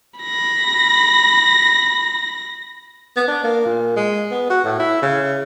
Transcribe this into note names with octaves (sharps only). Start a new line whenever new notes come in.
B5 A#6
B3
D4
A#3
A#2
G#3
B3
F#4
A2
E4
C#3